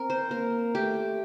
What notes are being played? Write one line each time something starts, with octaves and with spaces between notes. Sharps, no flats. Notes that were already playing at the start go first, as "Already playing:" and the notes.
Already playing: C4 A#4
C5
A#3 A#4
A3 G4